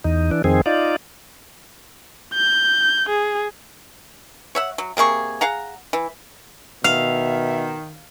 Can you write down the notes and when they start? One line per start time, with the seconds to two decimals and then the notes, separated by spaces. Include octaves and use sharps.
0.04 E2 D#4
0.31 E3 D4
0.44 F2 D#3 C4 G#4
0.66 D#4 F4 D5
2.34 G6
3.09 G#4
4.55 C#5 E5 F#5
4.78 F#3
4.97 C3 A#3 G#4 C#6
5.41 G#4 F5 F#5 A#5
5.93 E3
6.84 B2 D#3 E5 F5